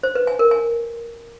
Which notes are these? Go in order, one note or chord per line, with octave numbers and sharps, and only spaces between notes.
C5
B4
G#5
A#4
G#5